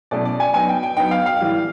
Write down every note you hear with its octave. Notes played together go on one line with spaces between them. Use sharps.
B2 F#3 A3 C#4 E4 D5
D5
G#5
F#3 B3 D#4 G#5
G5
G5
F#3 B3 D#4 G5
F5
F5
A2 E3 G3